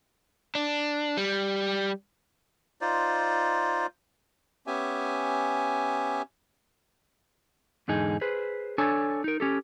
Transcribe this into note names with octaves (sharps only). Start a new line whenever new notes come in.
D4
G3
D#4 F4 C5 D5
B3 C#4 G4 E5 G#5
E2 G#2 D3 D#4 G#4
G#4 B4 C5
D4 A4 C#5 G#5
D#4 A#4
C#4 G4 A4